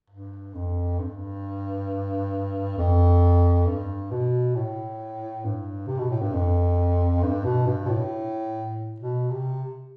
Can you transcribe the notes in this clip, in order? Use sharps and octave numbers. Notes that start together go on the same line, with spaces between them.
G2
F2
G2
F2
G2
B2
A2
G2
C3
B2
A2
G2
F2
G2
B2
G2
B2
A2
B2
C3